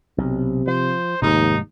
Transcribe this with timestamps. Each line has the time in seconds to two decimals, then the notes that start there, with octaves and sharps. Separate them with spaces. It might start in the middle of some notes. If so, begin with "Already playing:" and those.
0.18 B1 C3
0.67 F3 C5
1.22 F1 D#2 G#2 G#3 D#4